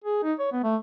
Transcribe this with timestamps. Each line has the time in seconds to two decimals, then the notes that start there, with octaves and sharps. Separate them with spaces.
0.04 G#4
0.23 D#4
0.39 C#5
0.52 B3
0.64 A3